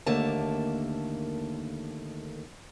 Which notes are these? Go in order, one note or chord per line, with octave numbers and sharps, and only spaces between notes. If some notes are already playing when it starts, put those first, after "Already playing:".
D#2 D3 A3 A#3 A5